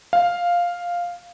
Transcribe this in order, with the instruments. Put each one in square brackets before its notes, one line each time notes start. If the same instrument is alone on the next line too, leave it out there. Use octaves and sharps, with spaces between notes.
[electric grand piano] F5